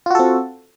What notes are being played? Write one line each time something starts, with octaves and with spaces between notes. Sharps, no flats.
C4 F4 F#4 A4